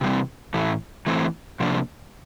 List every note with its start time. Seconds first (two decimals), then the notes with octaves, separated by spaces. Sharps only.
0.01 C3 E3 G3 C4
0.54 A2 E3 A3
1.06 E3 A3 C4
1.60 C3 F3 A#3 D4